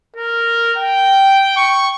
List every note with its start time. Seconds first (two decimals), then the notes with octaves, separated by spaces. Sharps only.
0.16 A#4
0.77 G5
1.57 C#6